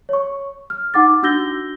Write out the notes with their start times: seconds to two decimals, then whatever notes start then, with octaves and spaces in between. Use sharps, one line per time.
0.09 C#5 C#6
0.70 F6
0.94 D#4 F#5 D6 A6
1.23 D4 F#4 E6 G6 A#6 G7